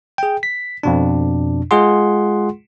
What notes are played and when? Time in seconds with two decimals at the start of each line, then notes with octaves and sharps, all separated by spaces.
0.18 G#4 G5
0.43 B6
0.83 F2 B2 D4
1.71 G#3 F4 G#4 F#5 C6